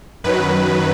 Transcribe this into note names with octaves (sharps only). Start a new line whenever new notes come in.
F#2 D#3 F#3 B4